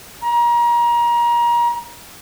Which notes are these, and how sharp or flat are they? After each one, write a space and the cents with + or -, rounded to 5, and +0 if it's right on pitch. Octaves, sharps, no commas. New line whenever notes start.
A#5 +30